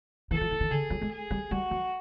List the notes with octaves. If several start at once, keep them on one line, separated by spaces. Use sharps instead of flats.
E3 A4
F3
E3
D#3
D3 G#4
F#3
G#3
G#4
G3
G3 F#4
F#3